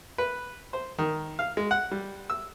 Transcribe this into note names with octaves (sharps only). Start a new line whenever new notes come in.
B4
C5
D#3
F5
G#3
F#5
G3
E6